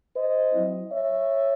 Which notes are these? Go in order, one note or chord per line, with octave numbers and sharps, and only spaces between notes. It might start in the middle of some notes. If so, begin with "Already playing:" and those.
C5 D#5
F#3 C4 E4
C#5 E5